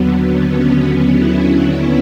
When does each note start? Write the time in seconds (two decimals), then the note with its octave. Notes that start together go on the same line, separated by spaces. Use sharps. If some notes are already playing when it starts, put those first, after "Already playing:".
Already playing: D#2 D3 F#3 B3
0.47 C#4
0.82 C#4
1.17 E4